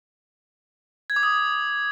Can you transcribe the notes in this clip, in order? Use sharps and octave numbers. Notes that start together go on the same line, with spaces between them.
G#6
D6
D#6